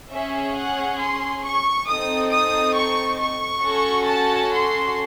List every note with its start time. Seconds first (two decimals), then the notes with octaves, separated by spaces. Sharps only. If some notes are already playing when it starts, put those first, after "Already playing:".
0.11 C#4 G#4 E5
0.56 F#5
0.99 C6
1.44 C#6
1.87 C4 D#4 A4 D#6
2.31 D#6
2.75 C#6
3.19 C#6
3.63 C#4 F#4 A4
4.07 A5
4.52 C6